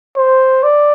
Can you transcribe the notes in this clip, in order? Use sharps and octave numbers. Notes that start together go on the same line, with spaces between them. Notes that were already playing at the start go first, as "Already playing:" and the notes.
C5
D5